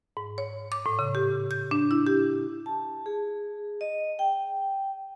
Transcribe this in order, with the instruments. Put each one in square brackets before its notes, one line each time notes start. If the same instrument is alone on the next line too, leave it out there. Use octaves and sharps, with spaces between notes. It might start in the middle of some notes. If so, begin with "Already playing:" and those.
[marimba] G#2
C#5
D6
A2
C#3
G4
G6
D4
E4
G4
[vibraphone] A5
G#4
D#5
G5